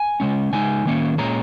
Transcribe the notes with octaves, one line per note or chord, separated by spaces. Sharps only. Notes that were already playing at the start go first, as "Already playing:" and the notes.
Already playing: G#5
C#3 G#3 C#4
C#3 G#3 D#4 G#5
D#3 A#3 C#4
A#2 G#3 C#4 A#5